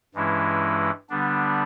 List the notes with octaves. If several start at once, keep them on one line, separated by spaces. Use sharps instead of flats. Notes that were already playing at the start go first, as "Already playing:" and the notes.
G2 E3 G#3 C#4 E4
D3 G3 B3 D4